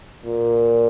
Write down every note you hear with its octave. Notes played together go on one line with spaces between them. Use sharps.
A#2